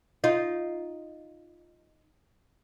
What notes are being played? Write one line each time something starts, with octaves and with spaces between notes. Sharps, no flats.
D#4 F4